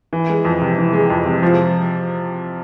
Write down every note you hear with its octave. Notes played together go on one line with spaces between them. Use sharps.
E3
G#3
F2
C3
E3
G#3
F2
C3
F3